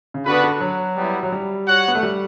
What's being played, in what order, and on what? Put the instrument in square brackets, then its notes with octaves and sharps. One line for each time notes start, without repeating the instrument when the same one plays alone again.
[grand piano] C#3
[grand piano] D3 [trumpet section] B3 D4 F#4 B4
[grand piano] D3
F#3
[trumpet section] G3 B3 E4
[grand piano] F#3
G3
[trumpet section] F#4 C#5 F#5
[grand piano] B3
A3
G3